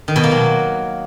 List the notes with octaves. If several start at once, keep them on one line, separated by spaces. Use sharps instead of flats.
D#3
B2
A#3
F#3